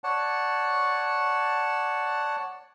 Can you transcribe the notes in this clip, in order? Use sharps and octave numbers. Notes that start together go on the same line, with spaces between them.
C#5 D5 F#5 A5